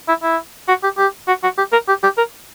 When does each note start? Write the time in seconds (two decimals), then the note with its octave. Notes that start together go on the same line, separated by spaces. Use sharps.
0.08 E4
0.23 E4
0.68 F#4
0.84 G4
0.98 G4
1.28 F#4
1.44 F#4
1.58 G4
1.73 A#4
1.88 G4
2.03 G4
2.18 A#4